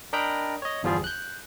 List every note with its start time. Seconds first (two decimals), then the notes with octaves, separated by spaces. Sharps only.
0.13 D4 A#4 D#5 G5 A#5 B5
0.62 C#5 D#5
0.83 G1 E2 F3 G3 F4 G#4
1.04 F#6 G6